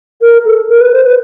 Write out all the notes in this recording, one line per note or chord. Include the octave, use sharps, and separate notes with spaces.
A#4
A4
A#4
B4
C5
B4